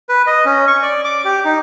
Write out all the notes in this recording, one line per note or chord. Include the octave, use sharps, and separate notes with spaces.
B4
D#5
C#4
C#6
D5
D6
G4
D#4